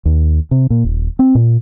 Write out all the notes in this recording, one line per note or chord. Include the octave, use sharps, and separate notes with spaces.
D#2
C3
A#2
D#1
C4
A#2